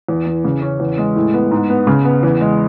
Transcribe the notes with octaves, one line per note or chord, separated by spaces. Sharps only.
E2
E3
C#3
C#4
E2
G#3
A2
B3
G#2
B3
C#3
B3
E2
G#3